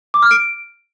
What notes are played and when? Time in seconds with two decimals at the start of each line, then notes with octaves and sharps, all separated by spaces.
0.14 D6
0.22 F6
0.31 D7